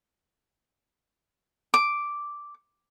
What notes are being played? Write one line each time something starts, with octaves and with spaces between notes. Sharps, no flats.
D6